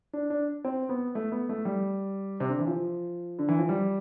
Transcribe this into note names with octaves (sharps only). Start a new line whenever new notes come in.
D4
D4
C4
B3
A3
B3
A3
G3
C3
D3
E3
F3
D3
E3
F3
G3